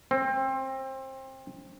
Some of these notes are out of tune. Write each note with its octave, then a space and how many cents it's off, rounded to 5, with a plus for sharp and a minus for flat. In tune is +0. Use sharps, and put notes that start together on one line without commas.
C4 +25